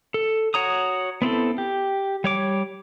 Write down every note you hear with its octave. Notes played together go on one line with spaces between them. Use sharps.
A4
F#4 C#5 A#5 D#6
B3 C4 E4 A4
G4
G3 C#5 D6